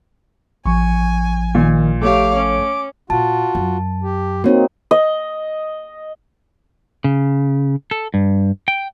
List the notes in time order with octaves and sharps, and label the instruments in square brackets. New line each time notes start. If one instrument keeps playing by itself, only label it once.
[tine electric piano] A1 F3 [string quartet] G#5 [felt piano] C#6
[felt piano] A#2 [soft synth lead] D#3
[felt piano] A3 [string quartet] G4 C#5 F5 [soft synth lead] D6
[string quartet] C#4 [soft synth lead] D6
[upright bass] A#2 [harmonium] F4 F#4 [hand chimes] A5
[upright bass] F#2
[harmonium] G4
[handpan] A#3 C4 D#4 [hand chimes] F#4 C#5
[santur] D#5
[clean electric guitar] C#3
A4
G2
G5